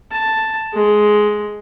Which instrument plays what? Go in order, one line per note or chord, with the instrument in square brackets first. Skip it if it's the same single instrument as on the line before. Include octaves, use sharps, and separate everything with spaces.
[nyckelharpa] A5
G#3